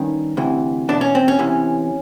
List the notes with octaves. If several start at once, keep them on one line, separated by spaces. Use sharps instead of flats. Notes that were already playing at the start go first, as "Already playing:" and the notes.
Already playing: G2 D#3 C#4
D2 C3 E3
E2 B2 D4
C#4
C4
C#4
E2 C3 E3